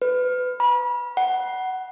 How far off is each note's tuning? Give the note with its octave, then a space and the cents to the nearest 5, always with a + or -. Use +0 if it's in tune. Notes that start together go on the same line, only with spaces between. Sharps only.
B4 +25
B5 -35
F#5 +15